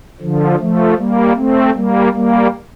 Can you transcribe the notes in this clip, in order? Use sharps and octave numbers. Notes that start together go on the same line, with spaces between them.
D3 F3
F3 A3
G3 A#3
A3 C4
G3 A#3
G3 A#3